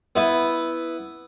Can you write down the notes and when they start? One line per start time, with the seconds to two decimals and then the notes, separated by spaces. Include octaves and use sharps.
0.16 B3 E4 B4